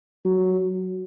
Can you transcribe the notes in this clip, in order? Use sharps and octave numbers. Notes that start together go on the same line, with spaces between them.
F#3